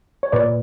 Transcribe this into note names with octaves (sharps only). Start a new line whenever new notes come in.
C#5
A#2 B4 D5